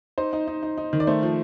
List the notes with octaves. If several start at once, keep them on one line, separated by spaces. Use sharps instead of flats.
D#4 C5
D#4
D#4
D#4
D#4
D#3
D5
A3 C5
F3